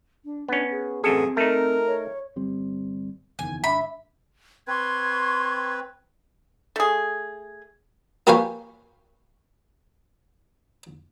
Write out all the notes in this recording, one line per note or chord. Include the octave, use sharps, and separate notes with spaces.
D4
B3 C#4 D4
G#4
A1 F#2 C4 G#4 A4
A3 D#4 A#4
C#5
G1 G3 C4
F#1 E2 D#3 G#5
G#1 D#3 D4 E5 B5
C4 B4 C6 C#6 G#6
A3 G#4
A#3 G4 B4 C#5 F5 G#5